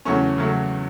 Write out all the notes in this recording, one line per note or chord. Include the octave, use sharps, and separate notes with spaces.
E2 C#3 F#3 A3 C#4 C#6
C#3 F#3 A3